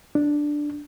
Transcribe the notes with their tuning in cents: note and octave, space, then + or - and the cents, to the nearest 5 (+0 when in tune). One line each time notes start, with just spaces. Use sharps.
D4 +5